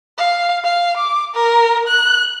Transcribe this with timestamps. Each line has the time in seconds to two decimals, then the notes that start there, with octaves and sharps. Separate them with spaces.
0.18 F5
0.64 F5
0.97 D6
1.35 A#4
1.87 F#6